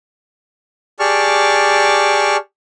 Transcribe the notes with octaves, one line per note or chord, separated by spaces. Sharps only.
G4 G#4 D5 A5 C#6 F6